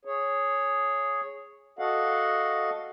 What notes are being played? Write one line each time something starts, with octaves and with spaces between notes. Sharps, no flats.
G#4 C#5
F#4 A4 D#5 F5 F#5